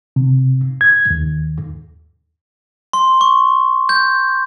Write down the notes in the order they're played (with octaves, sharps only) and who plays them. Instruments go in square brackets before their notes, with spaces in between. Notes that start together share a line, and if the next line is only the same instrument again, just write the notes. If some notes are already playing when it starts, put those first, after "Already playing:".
[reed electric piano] C3
G#6
D#2
[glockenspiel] C6
C#6
G6